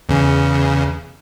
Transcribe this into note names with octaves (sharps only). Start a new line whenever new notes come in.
E2 C#3